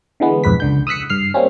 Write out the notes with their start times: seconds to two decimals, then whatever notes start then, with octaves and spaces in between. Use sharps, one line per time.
0.20 D3 E3 G#3 B3
0.44 B1 F2 G#2 B4 B6
0.60 C#2 D3 G6
0.87 D#6 E6 F#6 B6 C#7
1.10 G2 F6 C7
1.34 G3 A#3 C4 C#4